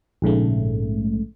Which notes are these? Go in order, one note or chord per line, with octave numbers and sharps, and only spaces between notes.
A#1 G#2 C#3 A3